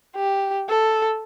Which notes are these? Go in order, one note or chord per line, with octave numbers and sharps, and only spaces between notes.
G4
A4